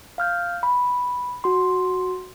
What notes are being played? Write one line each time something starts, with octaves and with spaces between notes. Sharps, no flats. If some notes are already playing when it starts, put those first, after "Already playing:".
F5 F6 G6
B5
F#4 C6